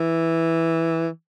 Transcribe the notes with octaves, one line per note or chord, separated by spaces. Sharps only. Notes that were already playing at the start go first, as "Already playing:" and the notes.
Already playing: E3